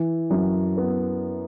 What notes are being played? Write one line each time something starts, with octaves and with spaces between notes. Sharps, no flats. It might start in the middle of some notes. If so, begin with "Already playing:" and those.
Already playing: E3
F#2
B3